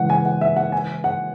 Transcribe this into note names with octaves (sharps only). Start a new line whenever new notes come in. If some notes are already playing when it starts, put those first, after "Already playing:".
Already playing: C#3 E3 G#3 F#5
G#5
F#5
E5
F#5
G#5
F#5